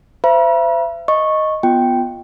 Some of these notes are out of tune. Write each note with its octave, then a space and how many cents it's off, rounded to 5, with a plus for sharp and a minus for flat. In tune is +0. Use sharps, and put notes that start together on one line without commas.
C5 -25 E5 +40 B5 -45
D#5 +0 C#6 -10
B3 +0 F4 +0 G5 +0